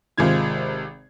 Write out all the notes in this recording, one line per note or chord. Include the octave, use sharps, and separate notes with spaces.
G#1 C3 G#3 F4 G#6